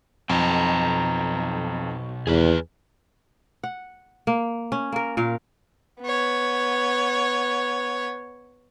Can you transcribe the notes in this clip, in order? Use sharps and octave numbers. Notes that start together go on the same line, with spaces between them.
B1 F2 D#4 G5 A5 A#5
E2 G#4 B4
F#5
A#3
C#4
A#3 A#4
A#2 A#4 F5
B3 C#5